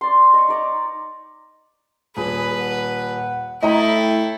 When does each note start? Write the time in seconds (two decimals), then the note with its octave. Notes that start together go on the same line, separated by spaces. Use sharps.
0.01 D5 C6
0.34 D#5 C#6
0.48 D#4 D5 A#5
2.17 D#1 G#4 B4
2.60 F#5
3.63 A2 E4 A4 D#5 G5 A#5